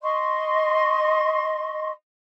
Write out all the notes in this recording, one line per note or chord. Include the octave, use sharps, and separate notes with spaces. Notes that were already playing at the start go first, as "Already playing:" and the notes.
D#5 C6 C#6